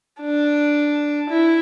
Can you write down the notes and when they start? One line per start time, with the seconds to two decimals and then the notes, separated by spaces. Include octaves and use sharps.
0.21 D4
1.30 E4